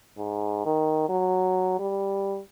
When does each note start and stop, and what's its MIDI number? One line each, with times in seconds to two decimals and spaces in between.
0.18 0.61 44
0.66 1.06 51
1.09 1.75 54
1.79 2.40 55